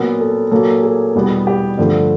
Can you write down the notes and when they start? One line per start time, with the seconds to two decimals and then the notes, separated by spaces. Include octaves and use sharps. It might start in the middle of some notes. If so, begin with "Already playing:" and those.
Already playing: A#2 F#3 B3 A#4
0.20 A4
0.51 A#2 F#3 A#3 A4
0.83 G#4
1.15 E2 B2 G3 B3
1.47 G4
1.78 G2 D3 F3 A3